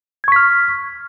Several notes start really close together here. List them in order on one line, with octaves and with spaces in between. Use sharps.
G#6 C#6 B6 F6